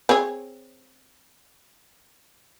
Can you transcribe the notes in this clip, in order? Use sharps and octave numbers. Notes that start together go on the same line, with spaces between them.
C4 G#4 C#5